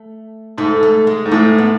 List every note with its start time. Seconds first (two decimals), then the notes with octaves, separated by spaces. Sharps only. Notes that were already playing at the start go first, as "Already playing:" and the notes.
Already playing: A3
0.58 G#2 A3
0.83 A3
1.07 G#3
1.25 G#2
1.31 A2 A3
1.58 B3